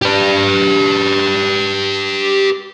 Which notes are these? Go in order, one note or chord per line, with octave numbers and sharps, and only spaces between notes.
G4 B4